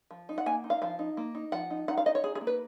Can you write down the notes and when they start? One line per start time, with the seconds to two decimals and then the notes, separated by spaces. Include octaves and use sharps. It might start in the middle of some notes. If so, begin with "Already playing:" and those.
0.11 F3
0.29 D#4
0.38 F#5
0.46 A#3 G#5
0.64 D#4
0.70 F5
0.82 F3 F5
0.99 D#4
1.17 A#3
1.35 D#4
1.52 F3 F#5
1.70 D#4
1.88 D#4 F#5
1.98 F5
2.06 D#4 D#5
2.15 C#5
2.24 D#4 G#4
2.35 G#4
2.41 A#3
2.47 B4